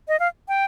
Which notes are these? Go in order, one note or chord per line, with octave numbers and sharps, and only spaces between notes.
D#5
F5
G5